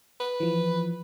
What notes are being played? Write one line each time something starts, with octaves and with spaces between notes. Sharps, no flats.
B4
E3 F3